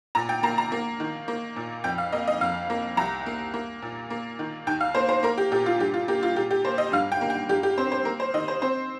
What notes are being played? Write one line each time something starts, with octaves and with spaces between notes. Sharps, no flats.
A#2 A#5
G5
A#3 A#5
A#5
A#3
D#3
A#3
A#2
F2 G5
F5
A#3 D#5
D#5
F2 F5
A#3
C2 A#5
A#3
A#3
A#2
A#3
D#3
D#2 G5
F5
A#3 C5
C5
A#3 A#4
G4
A#2 G4
F4
G2 G4
F4
A#3 G4
F4
A#2 G4
G4
A#3 C5
D#5
G2 F5
G5
A#3
G5
G2 G4
G4
C4 C5
C5
A#3 A#4
C5
D#3 D#5
C5
C4 C5